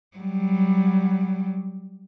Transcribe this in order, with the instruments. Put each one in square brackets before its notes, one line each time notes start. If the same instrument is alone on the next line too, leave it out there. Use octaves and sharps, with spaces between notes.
[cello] F#3 G3